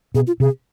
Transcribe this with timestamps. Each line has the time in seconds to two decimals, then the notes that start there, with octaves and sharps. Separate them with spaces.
0.14 B2 G#4
0.27 F4
0.40 C3 G#4